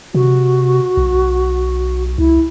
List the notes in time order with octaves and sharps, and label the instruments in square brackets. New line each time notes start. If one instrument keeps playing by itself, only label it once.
[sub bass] C3 [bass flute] F#4
[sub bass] B1
[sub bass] C#2 [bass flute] E4